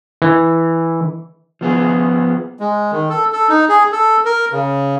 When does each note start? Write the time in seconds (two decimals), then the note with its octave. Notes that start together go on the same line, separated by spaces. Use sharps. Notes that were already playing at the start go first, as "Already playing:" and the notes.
0.22 E3
1.61 F3 B3 G#4
2.59 G#3
2.92 D#3
3.09 A4
3.32 A4
3.49 D#4
3.69 G#4
3.92 A4
4.25 A#4
4.52 C#3